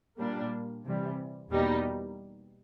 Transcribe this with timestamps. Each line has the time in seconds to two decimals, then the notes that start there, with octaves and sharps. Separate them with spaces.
0.19 A#2 G3 A#3 D4
0.85 C3 E3 G3
1.50 E2 B2 G3 A#3 D#4